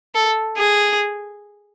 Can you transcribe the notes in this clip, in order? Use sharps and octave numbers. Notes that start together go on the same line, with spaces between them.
A4
G#4